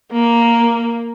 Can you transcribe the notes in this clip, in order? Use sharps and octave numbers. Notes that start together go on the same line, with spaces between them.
A#3